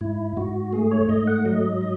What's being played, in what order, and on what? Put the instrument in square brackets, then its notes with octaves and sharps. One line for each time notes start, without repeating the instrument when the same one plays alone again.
[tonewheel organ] G#2 E4
G#2 F#4
A3 G#4
C#5
G#2 D#5
F#5
F#3 D#5
D#5